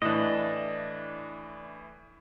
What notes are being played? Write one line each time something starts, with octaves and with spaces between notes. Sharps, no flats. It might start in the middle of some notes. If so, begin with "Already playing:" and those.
A2 E3 D4 D#5